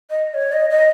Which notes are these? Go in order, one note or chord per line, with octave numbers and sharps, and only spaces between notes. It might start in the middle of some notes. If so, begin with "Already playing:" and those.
D#5
C#5
D#5
D#5